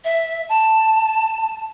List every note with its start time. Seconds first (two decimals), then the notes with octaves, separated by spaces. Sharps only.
0.04 E5
0.48 A5